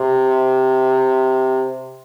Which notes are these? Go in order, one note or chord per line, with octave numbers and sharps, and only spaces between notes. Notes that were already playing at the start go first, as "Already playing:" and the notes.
Already playing: C3